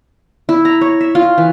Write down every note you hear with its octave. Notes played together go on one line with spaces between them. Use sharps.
E4
A#5
C#5
E5
F4
E3